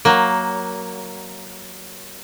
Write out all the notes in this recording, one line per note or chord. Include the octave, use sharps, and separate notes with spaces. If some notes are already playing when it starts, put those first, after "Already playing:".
F#3 A#3